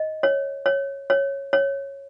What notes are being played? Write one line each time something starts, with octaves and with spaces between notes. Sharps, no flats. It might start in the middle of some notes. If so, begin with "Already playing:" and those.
Already playing: D#5
C#5
C#5
C#5
C#5